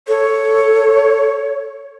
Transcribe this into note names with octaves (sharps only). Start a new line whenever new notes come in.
A4 C#5